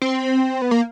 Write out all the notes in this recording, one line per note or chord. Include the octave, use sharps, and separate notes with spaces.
C4
B3
A#3